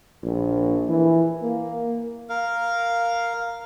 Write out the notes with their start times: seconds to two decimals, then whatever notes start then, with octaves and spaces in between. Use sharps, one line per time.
0.23 A#1
0.89 E3
1.43 A#3
2.29 A#4 F5